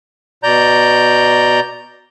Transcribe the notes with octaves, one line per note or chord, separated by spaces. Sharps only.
B2 D5 A#5 G6